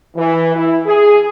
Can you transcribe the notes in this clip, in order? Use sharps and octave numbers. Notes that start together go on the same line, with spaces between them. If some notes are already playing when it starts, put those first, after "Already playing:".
E3
E4
G#4